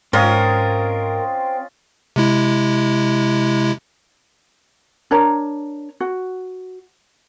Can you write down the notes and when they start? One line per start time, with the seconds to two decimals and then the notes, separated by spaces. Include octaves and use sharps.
0.13 G#2 C4 C#4 F4 A#4 D#5
2.16 C3 G#3 E4
5.11 D4 A#4 C#5 A#5
6.00 F#4